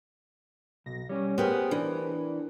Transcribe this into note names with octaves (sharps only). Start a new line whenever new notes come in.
B1 A#6
G3 C#4 C#5
B3 G4 G#4 A#4 C5
E3 D4